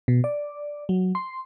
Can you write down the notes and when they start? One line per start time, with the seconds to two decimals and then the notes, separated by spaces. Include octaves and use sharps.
0.08 B2
0.24 D5
0.89 F#3
1.15 C6